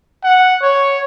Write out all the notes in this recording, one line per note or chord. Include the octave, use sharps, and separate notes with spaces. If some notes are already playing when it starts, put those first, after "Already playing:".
F#5
C#5